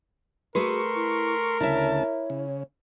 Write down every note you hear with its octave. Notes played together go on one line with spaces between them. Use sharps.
A3 F#4 G#4 A#4 B4 C6 C#6
E4
D2 C#3 E4 C#5 E5 A5
C#3